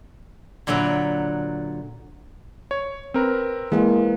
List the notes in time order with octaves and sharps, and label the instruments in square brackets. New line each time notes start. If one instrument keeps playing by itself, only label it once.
[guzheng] A#2 D3 F#3 B4 E5
[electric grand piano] C#5
C4 A#4 B4
[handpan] E3 A#3 [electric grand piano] G#3